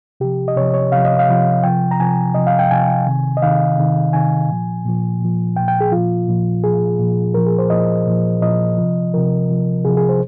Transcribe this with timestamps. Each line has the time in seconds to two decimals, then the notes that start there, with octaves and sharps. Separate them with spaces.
0.20 C3 F3 G4
0.48 D#5
0.56 C3 F3 C#5
0.74 C#5
0.92 C3 F3 F5
1.05 D#5
1.19 F5
1.28 C3 F3
1.63 C3 F3 G5
1.91 A#5
2.00 C3 F3 G#5
2.34 C3 F3 D#5
2.47 F5
2.59 G5
2.71 C3 F3 G#5
3.07 C3 D#3
3.37 D#5
3.42 C3 D#3 F5
3.78 C3 D#3
4.13 C3 D#3 G#5
4.49 A#2 F3
4.85 A#2 F3
5.21 A#2 F3
5.56 F3 G5
5.60 A#2
5.68 G5
5.81 G#4
5.92 A#2 F3 F4
6.28 A#2 F3
6.64 A#2 F3 G#4
6.99 A#2 F3
7.34 A#2 F3 A#4
7.46 G#4
7.59 C5
7.70 A#2 F3 D#5
8.07 A#2 F3
8.42 A#2 F3 D#5
8.78 C3 F3
9.14 C3 F3 A#4
9.49 C3 F3
9.85 C3 F3 G#4
9.97 G#4
10.09 C5